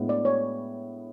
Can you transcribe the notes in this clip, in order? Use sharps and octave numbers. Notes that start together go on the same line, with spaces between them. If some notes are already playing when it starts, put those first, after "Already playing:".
Already playing: A2 G#3 B3 D4
D5
C#5